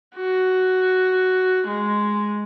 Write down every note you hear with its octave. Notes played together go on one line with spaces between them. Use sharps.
F#4
G#3